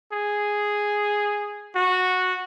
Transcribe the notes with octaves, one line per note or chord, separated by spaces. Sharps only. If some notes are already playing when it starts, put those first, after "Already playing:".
G#4
F#4